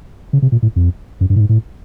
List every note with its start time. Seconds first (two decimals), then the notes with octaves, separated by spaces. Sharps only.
0.33 C#3
0.42 C3
0.52 A#2
0.62 A2
0.76 F2
1.21 F#2
1.30 G2
1.36 A2
1.40 G#2
1.49 A2